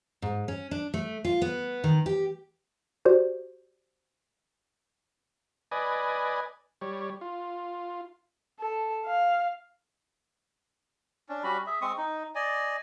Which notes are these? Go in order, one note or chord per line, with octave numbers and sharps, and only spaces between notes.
G#2
C#4
D4
A3
F4
B3
D#3
G4
F#4 G4 C5 D5
B4 D5 D#5 G#5
G3 C#5
F4
A4
F5
C#4 D4
G3 C#4 F#4 B5
G#4 E5
G#3 C4 C#6 D#6
D#4
D5 D#5 G#5